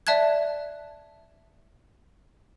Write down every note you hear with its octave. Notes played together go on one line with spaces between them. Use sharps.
D5 E5 A5 F#6 G#6